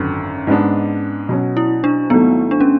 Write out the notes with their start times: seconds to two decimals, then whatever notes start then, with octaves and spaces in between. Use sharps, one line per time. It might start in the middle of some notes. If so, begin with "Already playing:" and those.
Already playing: G#1 F#2 D3 C#4
0.47 G#2 G#3 B3 D4
1.29 B2 F#3 C#4
1.57 E4
1.84 D4
2.10 G#1 G#2 F#3 A3 B3
2.51 D4
2.61 C#4